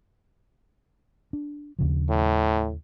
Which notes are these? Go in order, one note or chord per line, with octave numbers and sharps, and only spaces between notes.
D4
D#2 C#3 F3
A2